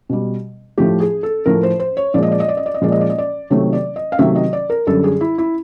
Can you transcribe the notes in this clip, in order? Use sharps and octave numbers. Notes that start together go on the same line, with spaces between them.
B2 G3
A2 F3 A3 G4
G#4
A4
A2 F3 A3 A#4
C5
C5
C#5
A#2 F3 G#3 D5
D#5
D5
D#5
D5
D#5
D5
D#5
A#2 F3 G#3 D5
D#5
D5
D#5
D5
C3 D#3 F#3 A3 C#5
D5
D#5
F5
C3 D#3 F#3 A3 E5
D#5
D5
A#4
F#2 D3 G3 A4
G#4
E4
E4